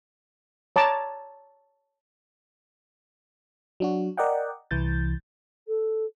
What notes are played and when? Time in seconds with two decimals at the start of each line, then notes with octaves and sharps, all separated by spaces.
0.76 C#5 A5 A#5 D6
3.80 F#3 D4 F#4
4.17 A#4 D5 D#5 F#5 G5
4.71 C2 E3 G6 A6
5.67 A4